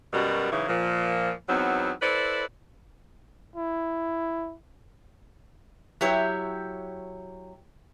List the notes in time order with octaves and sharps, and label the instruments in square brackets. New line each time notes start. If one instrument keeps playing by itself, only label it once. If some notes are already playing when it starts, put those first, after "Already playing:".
[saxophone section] F#2 B2 G3 A#4
G#2 C#3 E3 F#3
A#2 F3
E2 F#3 B3 C4 D#4
E4 A4 B4 C5 D5
[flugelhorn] E4
[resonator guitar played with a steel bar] F#3 E4 G4 C#5